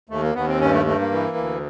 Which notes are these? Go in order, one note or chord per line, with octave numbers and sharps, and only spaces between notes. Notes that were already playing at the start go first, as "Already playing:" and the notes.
D#2 A3
A#3
D#2 B3
C4
G2 C#4
A3
G2 A3
A#3
E3
D2